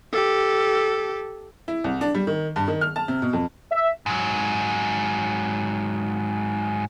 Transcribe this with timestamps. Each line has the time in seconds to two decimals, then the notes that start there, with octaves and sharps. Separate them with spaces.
0.13 G4 A4
1.68 E4
1.84 C2
2.01 D4
2.15 G3
2.27 D#3
2.56 G2
2.68 D#3
2.81 F6
2.96 A5
3.08 C3
3.22 B2
3.33 F2
3.72 E5
4.06 G#2 F#3